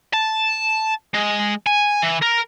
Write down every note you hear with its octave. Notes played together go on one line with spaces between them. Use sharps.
A5
G#3
G#5
E3
A#4